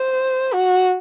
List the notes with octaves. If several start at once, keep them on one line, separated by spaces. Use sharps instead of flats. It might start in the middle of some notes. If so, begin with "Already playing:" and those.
Already playing: C5
F#4